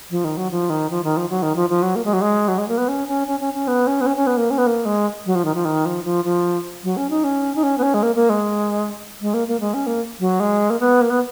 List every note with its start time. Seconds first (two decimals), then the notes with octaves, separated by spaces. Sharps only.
0.11 F3
0.24 D#3
0.37 F#3
0.51 F3
0.70 D#3
0.90 F3
1.04 D#3
1.17 F3
1.29 F#3
1.43 D#3
1.56 F3
1.70 F3
1.83 F#3
1.96 A#3
2.05 G#3
2.13 F#3
2.21 G#3
2.48 F#3
2.58 G#3
2.68 A#3
2.78 B3
2.88 C#4
3.08 C#4
3.27 C#4
3.40 C#4
3.54 C#4
3.68 B3
3.87 C#4
4.01 B3
4.07 C#4
4.17 C#4
4.27 B3
4.37 A#3
4.51 C#4
4.58 B3
4.67 A#3
4.85 G#3
5.26 F#3
5.35 F3
5.45 D#3
5.55 F3
5.65 D#3
5.85 F3
6.05 F3
6.25 F3
6.84 F#3
6.97 C#4
7.10 D#4
7.24 C#4
7.56 D#4
7.63 C#4
7.78 B3
7.83 C#4
7.94 G#3
8.03 A#3
8.16 A#3
8.30 G#3
9.21 G#3
9.34 A#3
9.48 A#3
9.60 G#3
9.74 C#4
9.87 A#3
10.20 F#3
10.40 G#3
10.70 A#3
10.80 B3
11.01 A#3
11.10 B3